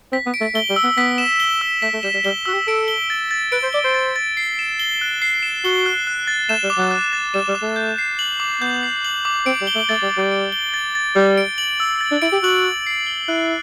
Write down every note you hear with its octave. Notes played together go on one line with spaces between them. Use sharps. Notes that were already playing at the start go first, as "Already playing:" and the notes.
C4 B6
B3
D7
A3
A3 G7
G3
E6
B3
B3 B6
E7
G7
E6
A3 B6
A3
G3 E7
G3
G3 G7
F#4 E6
G4
A4 D7
G7
A6
A6
B4 D7
C5
D5 G7
C5
A6
A6
C7
E7
G7
F#6
C7
E7
F#4 G7
F#6
F#6
A6
A3 E7
G3
D6
F#3
F#6
A6
G3 E7
G3
D6
A3
G6
C7
F#7
D6
B3 G6
C7
F#7
D6
C4 D7
G3
G7
A3
A3 A6
G3
A6
G3
D7
G7
A6
A6
G3 A6
D7
F#7
E6
A6
D4
E4 D7
G4
F#4 F#7
E6
C7
G7
E4 F#6